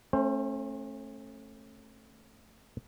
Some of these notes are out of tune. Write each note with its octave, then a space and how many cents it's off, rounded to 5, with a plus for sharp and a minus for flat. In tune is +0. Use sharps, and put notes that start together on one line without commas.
A3 +0 C#4 -40 C5 +15